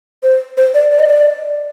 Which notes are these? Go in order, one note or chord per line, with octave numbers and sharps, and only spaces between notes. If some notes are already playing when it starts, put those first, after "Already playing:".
C5
C5
D5
D5
D#5
D5